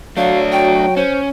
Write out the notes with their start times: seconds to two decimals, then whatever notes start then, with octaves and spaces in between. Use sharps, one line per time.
0.17 F#3 A3 D4 F5
0.52 G5
0.97 C#4 C5